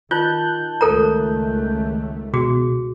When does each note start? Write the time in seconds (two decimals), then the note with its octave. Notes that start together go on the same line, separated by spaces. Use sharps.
0.11 D#3 F4 A5 F#6 G6
0.81 C#2 D#3 A3 A4 A#4 A#5
2.34 B2 F#4 G#4